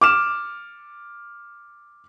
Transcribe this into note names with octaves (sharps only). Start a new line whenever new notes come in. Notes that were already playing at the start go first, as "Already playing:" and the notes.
D6 F6 E7